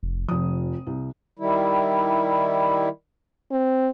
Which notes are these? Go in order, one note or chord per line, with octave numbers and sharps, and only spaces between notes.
F1
F1 F3 D#6
C2
D#3 G3 E4
C4